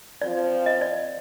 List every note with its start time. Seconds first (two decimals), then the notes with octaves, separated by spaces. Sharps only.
0.22 F3 C4 F4 D5
0.66 D#5
0.81 D5